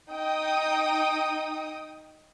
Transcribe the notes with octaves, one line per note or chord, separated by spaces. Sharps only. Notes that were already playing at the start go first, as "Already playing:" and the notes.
D#4 G5 D#6